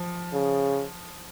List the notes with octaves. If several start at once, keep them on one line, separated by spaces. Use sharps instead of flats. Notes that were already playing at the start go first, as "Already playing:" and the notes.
Already playing: F3
C#3